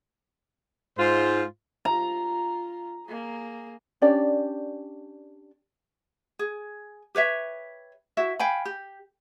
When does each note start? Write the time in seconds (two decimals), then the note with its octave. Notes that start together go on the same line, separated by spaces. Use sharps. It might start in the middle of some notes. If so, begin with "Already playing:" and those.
0.98 G#2 F4 C5
1.85 F4 A#5
3.06 A#3 G#4
4.02 C#4 D4 G4 D5
6.39 G#4
7.15 G4 B4 C#5 E5
8.17 E4 F#4 E5
8.39 F5 G5 G#5 B5
8.65 G4